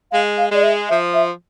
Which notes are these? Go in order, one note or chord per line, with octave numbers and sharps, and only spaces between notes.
G#3 F5
F5
G#3 D5
E5
F3 E5
E5